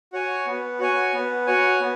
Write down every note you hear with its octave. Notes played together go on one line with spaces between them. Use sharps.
F#4 C#5 G#5
B3
F#4 C#5 G#5
B3
F#4 C#5 G#5
B3